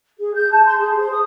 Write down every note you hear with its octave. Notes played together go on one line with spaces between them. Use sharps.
G#4
G6
A5
C6
G#4
C5
D#6